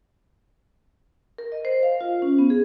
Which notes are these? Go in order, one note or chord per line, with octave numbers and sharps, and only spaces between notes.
A#4
D#5
C5
F5
F4
C#4
B3
G#4